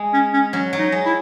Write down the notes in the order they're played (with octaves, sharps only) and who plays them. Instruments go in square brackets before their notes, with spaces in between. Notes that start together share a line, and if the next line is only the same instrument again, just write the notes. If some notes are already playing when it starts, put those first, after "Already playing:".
Already playing: [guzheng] G#3
[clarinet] C#4
C#4
[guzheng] F#3 [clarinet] C#4
[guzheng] F#3
[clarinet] D#4
[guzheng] G#3
[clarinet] E4